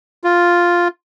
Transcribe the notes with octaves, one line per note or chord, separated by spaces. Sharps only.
F4